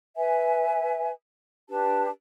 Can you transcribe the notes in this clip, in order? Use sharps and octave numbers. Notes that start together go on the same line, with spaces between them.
B4 E5 G#5
D4 G4 B4 A5